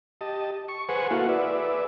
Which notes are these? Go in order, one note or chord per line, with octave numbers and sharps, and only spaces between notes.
G4 D#5 A5
C#6
G#4 B4 C5 F#5 G#5 C#6
A#3 E4 F#4 A4 F5 F#5
G#4 B4 D5 E5